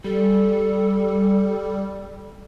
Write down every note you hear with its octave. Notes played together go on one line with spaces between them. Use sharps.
G3 A4